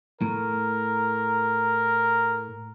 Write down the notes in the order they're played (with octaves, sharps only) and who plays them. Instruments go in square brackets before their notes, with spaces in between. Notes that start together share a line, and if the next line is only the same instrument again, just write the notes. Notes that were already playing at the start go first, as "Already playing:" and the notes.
[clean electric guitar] A2 [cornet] A#4